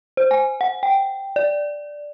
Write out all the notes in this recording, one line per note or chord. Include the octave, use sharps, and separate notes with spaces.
C5
G#5
F#5
G5
D5